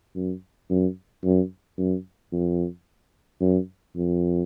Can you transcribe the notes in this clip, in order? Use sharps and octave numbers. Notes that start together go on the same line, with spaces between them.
F#2
F#2
F#2
F#2
F2
F#2
F2